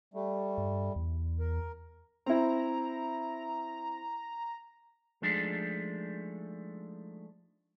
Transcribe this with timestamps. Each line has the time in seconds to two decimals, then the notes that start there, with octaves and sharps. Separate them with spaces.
0.14 G3 A3
0.58 G2
0.96 E2
1.39 A#4
2.26 C4 E4 A#5
5.22 F3 G#3 A3 D4 D#4